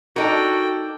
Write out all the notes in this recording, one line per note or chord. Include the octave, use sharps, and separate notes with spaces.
D4 D#4 F#4 A4 A#4 G5